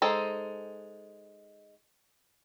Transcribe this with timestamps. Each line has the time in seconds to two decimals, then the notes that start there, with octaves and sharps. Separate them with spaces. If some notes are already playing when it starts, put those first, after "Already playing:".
0.02 G#3 D#4 A4 C5